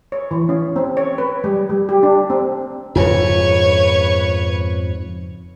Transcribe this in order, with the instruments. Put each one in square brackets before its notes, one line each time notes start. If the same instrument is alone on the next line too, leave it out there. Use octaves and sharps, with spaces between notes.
[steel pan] C#5
E3
C#4
C4
C#5
B4
G3
G3
G4
D4
C4
[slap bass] F2 G#2 C#3 [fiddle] B4 C#5